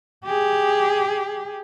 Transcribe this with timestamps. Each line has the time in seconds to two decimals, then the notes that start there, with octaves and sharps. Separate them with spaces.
0.25 G4 G#4